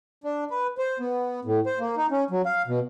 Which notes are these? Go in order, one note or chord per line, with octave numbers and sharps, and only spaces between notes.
D4
B4
C5
B3
A2
C5
A#3
D#4
C#4
F#3
F5
B2